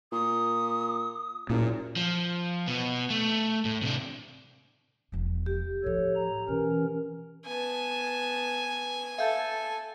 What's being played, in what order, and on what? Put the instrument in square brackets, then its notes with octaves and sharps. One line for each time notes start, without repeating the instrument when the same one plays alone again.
[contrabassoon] A#2 [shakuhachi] D#6
[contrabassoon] F#1 [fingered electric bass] A#2 [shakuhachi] A#4
[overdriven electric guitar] F3
B2 B3
A3
A2
C3 D4
[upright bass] E1 F3
[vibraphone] G4
[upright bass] A2 F3 [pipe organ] A4 C#5
[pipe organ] A#5
[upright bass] B2 [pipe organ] E3 C#4 A#4
[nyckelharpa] B3 A5 [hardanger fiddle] G#5
[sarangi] A4 [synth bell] E5 F5 G6